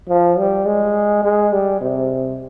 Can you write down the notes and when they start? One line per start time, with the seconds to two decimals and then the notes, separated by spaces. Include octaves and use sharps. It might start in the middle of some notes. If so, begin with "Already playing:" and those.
0.09 F3
0.38 G3
0.66 G#3
1.23 G#3
1.52 G3
1.81 C3